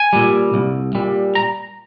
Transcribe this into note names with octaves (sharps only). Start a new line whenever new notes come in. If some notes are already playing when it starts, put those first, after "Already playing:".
Already playing: G#5
A#2 G3
C2
A#2 G3
A#5